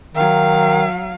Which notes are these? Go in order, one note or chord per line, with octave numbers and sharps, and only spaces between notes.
D#3 F#3 F5